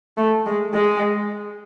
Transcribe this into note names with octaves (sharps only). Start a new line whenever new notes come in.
A3
G#3
G#3